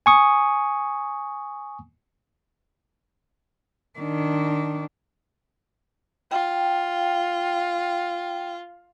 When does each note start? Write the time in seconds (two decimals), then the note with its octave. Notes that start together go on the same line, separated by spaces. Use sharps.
0.06 G#5 C#6 D#6
3.99 D#3 D4
6.31 F4 G5